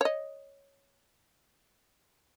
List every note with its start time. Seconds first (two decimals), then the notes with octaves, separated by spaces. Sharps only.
0.01 C#5 D#5